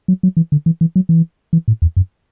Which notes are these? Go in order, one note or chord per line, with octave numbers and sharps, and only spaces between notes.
F#3
F#3
E3
D3
E3
E3
F#3
E3
E3
A2
E2
F#2